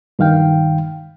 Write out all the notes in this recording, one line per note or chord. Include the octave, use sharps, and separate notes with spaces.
G2 D#3 F5 G5